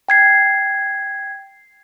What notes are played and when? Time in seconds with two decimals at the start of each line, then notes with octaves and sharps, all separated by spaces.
0.09 G5 G#6 C7